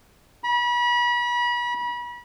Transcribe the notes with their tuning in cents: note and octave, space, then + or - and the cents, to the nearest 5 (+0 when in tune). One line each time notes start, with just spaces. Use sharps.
B5 -35